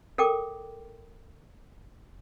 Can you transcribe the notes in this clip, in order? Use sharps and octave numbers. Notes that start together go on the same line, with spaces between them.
A4 A#4 G5 D6